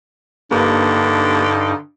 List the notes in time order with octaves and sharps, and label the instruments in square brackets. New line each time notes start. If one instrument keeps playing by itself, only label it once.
[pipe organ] G2 D#4 [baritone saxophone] D3 [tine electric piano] A#3 G4 B4